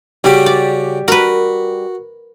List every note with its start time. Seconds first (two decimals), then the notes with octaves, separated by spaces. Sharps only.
0.24 C#3 G3 F#4 G4 D6
0.46 D5
1.08 F#4 A#4 B4